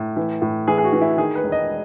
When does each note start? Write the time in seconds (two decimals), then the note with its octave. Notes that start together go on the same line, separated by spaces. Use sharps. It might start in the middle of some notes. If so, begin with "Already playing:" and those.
Already playing: A2
0.17 E3
0.42 A2
0.68 E3 G#4
0.78 G#4
0.84 F#4
0.93 E3
1.01 E4
1.18 D#3 G#4
1.35 B4
1.44 E1
1.52 D#5